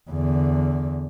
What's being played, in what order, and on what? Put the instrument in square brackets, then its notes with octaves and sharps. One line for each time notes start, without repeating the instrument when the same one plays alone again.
[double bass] E2 D3